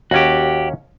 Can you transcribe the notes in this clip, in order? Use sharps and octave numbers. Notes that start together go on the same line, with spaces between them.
D#2 C#4 F#4 G4